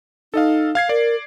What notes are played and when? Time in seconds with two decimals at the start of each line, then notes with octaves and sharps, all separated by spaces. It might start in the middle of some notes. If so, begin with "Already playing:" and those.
0.34 D#4 A4 D#5 F5
0.75 F5 G#6 C7
0.89 A#4 D5